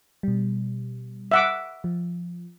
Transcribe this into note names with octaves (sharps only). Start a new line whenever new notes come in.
B2 G3
E5 F#5 D6
F3